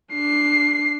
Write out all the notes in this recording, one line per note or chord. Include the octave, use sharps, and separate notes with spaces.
D4 C7